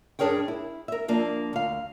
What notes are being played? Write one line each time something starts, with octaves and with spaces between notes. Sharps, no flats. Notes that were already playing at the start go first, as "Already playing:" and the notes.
G2 D4 G#4 A#4 C#5 G5
E4
A#4 E5
F3 A#3 D4
D2 F5